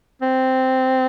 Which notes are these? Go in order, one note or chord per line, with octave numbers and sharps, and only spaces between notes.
C4